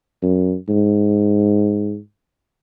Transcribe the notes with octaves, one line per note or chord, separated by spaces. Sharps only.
F#2
G#2